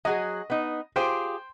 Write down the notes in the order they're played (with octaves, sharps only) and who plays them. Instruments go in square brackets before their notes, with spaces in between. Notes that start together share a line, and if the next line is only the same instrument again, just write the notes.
[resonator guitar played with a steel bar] F#3 F#4 G#4 [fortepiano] D#5
[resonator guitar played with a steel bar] B3 D#4
[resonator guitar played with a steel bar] F4 G4 G#4 [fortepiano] C5 G5 C6